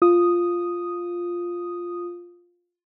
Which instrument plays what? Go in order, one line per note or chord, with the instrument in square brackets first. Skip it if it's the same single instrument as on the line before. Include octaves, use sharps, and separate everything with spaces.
[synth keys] F4 D#6